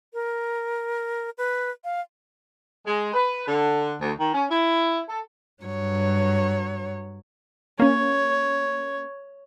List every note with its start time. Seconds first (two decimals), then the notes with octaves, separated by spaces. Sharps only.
0.14 A#4
1.38 B4
1.84 F5
2.86 G#3
3.14 B4
3.47 D3
4.01 D2
4.19 D#3
4.34 C#4
4.50 E4
5.09 A4
5.63 G2 F#3 C#5
7.80 A#3 C#4 C#5